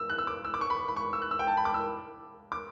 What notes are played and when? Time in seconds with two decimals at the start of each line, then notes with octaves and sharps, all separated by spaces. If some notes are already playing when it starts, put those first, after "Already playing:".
Already playing: E6
0.10 F#6
0.18 E6
0.27 D6
0.45 E6
0.54 D6
0.61 C#6
0.70 B5
0.88 B5
0.96 C#6
1.13 E6
1.22 F#6
1.31 E6
1.39 G5
1.47 A5
1.57 B5
1.65 D6
1.74 E6
2.52 D6